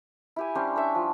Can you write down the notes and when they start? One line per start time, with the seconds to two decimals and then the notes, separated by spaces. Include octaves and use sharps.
0.36 E4 G4 G#5
0.55 G3 C#4 D4 C5
0.76 D4 C#5 E5
0.95 F3